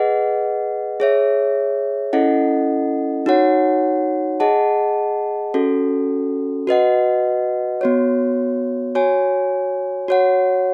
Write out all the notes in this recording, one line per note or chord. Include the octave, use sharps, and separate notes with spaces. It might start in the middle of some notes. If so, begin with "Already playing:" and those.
Already playing: G#4 B4 D#5 F#5
G#4 C#5 E5
C#4 E4 A4 D#5 F#5
D#4 F#4 C#5 F#5
G#4 D#5 F#5 A5
C#4 F#4 A4
F#4 B4 D#5 F#5
B3 F#4 C#5
F#4 C#5 G#5
F#4 C#5 F#5